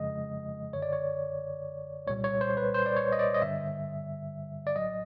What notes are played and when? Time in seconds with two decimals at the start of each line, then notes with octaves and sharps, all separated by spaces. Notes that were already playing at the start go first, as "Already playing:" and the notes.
Already playing: F2 C#3 F3 G#3 D#5
0.73 G1 F#2 D3 C#5
0.82 D5
0.93 C#5
2.07 C2 A#2 G3 C#5
2.24 C#5
2.41 C5
2.57 B4
2.74 C5
2.86 D5
2.96 C#5
3.12 D#5
3.19 D5
3.34 D#5
3.41 G2 D3 G3 E5
4.67 D5
4.76 A#1 A2 F#3 D#5